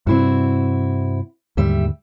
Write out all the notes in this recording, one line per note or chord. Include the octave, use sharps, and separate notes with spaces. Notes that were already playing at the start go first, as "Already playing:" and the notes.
G2 C3 C4 E4 F#4
D#2 G#2 D3 G3 E5